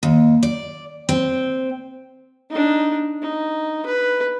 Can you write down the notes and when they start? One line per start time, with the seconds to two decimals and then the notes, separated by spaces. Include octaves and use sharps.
0.03 D#2
0.43 D5
1.09 C4
2.50 D4 D#4
3.22 D#4
3.86 B4